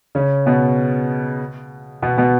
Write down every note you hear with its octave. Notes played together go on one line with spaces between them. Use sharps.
C#3 C#4
B2 B3
B2 B3
B2 B3